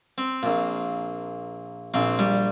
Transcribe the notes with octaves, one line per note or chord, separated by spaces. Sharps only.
C4
A#1 A#2
A#1 A#2 C4
G3